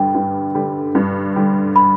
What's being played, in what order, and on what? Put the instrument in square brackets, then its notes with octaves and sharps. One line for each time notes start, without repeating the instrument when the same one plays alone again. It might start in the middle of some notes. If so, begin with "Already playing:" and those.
Already playing: [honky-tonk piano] G2 D3 G3 [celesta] G5
[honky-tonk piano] G2
D3 G3
G2
D3 G3
[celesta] B5